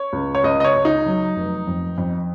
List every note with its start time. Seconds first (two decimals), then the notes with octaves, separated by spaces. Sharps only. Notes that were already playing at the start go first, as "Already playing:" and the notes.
Already playing: C#5
0.13 C#2
0.35 C#5
0.44 C#2 D#5
0.60 D#5
0.65 C#5
0.75 C#2
0.85 D#4
1.06 F#3
1.36 F1
1.67 F2
1.98 F2